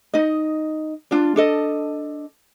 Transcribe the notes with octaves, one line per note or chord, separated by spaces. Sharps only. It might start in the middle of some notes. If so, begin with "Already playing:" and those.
D#4 D#5
D4 F4 D5
D4 A4 D#5